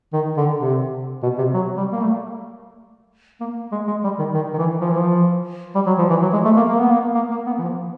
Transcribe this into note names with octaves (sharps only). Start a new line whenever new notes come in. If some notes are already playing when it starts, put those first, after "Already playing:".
D#3
D3
C3
B2
C3
F#3
G3
A#3
A3
A#3
G#3
G#3
G3
D#3
D#3
D#3
E3
F3
E3
F3
G3
F#3
F3
E3
F#3
G#3
A3
A#3
A#3
B3
A#3
A#3
A#3
B3
E3
F3